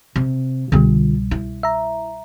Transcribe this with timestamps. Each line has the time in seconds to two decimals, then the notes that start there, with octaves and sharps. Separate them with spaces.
0.16 C3
0.72 C2 B2 D3 G3 F4
1.31 E4
1.63 E5 A#5